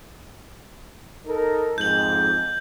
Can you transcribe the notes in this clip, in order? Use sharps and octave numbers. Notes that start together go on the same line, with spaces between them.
D#4 A4 A#4
F2 G#2 G6 F#7